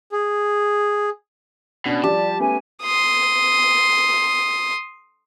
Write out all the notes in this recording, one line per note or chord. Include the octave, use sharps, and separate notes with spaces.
G#4
B2 C#4 D4
F3 G3 G4 D5 A5
A3 B3 C#4 G#5
C6 D#6